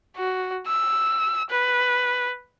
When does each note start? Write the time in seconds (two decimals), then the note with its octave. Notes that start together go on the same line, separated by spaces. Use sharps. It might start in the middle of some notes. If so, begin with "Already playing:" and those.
0.17 F#4
0.67 E6
1.50 B4